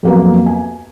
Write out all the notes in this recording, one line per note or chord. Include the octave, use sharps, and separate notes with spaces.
F2 F#3 A#3 B3 A#4
G#5